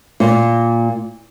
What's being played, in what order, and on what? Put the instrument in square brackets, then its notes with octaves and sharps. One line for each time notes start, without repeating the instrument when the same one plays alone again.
[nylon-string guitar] A#2